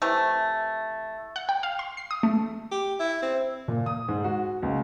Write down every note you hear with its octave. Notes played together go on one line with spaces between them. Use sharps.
C3 E3 A3
F#5
G5
F5
C6
C7
D#6
A3
G4
E4
C4
A#2
D#6
G#2
F#4
C#2